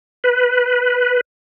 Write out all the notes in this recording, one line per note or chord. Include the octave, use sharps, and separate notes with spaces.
B4